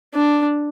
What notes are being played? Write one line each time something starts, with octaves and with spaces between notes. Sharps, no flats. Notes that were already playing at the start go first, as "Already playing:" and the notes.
D4